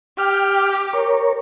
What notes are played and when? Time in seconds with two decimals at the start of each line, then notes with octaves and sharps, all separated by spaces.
0.18 G4 G5 F6
0.93 A#4 C#5